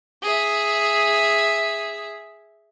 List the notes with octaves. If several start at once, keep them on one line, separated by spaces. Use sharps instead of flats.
G#4 E5